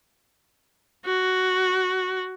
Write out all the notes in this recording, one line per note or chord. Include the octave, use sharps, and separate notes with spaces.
F#4